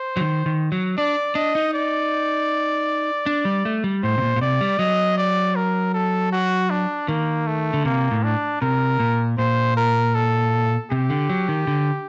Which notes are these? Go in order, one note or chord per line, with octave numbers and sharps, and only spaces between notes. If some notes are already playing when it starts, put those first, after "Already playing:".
Already playing: C5
F#3
D#3
D#3
F#3
D4 D5
D4 D#5
D#4
D5
D4
G3
A3
G3
A2 C5
C3
A#2
A#2
C3 D5
G3
F#3 D#5
D5
A#4
A4
F#4
D4
D#3 A#3
A3
D3
C3 A#3
A2
D4
C3 A#4
A#2
A#2 C5
A#4
A4
C3 G4
D3
F#3
D#3
D3